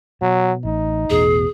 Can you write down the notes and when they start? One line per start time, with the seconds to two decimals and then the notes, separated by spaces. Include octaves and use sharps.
0.22 B2 F#3
0.65 A1 D#4
1.10 A1 E2 B2 G#4